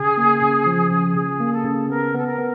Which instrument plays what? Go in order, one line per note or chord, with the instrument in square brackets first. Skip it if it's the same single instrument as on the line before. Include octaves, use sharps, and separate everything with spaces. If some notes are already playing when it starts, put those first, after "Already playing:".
Already playing: [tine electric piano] C#3 [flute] G#4
[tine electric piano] A#3
C#3
F3
C#3
[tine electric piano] C#3 [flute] G#4
[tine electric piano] A#3
[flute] A4
[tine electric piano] C#3
[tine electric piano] B3 [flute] A#4
[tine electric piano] B3 [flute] A4
[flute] A#4
[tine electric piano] B3